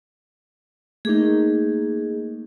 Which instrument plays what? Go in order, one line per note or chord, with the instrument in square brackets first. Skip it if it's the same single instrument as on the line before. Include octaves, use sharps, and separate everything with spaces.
[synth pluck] A3 A#3 D#4 [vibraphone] G#4